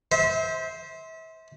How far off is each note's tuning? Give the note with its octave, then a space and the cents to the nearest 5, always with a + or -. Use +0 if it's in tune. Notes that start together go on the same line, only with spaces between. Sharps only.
C5 +0 E5 -35